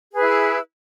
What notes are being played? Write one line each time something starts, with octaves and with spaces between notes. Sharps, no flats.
E4 G#4 B4